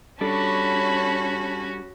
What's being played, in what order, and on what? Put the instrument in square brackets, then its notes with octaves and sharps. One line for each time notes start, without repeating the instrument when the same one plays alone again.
[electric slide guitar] G3 D4 A4 [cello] C#4 F#4 [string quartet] C#5 A5 B5